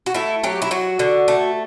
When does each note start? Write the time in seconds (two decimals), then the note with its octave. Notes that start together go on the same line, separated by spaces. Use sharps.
0.06 F#4
0.14 A3 E4
0.43 F#3 G4
0.62 E4
0.71 F#3 F#4
0.99 D3
1.28 A3